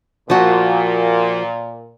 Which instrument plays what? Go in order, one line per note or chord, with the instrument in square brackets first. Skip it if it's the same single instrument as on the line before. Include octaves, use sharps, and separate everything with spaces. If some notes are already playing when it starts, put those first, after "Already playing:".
[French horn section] A#2 [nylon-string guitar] F3 F#4